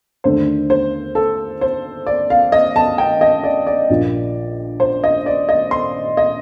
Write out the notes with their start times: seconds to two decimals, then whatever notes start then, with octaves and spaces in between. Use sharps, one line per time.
0.24 D#2 D3 A3 C5
0.70 C5
1.15 A4
1.61 C5
2.07 D5
2.30 F5
2.52 D#5
2.76 A5
2.98 G5
3.21 D#5
3.44 D5
3.67 D5
3.90 A#1 A#2 F3
4.80 C5
5.04 D#5
5.26 D5
5.49 D#5
5.71 C6
6.17 D#5